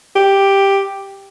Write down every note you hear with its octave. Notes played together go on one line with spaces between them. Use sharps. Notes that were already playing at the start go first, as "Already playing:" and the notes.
G4